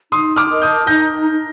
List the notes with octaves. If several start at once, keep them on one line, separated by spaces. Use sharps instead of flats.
D#4 C6 D#6
D6 F6
A#4 D#5 A5
D#6 G6
D#4 G6 A#6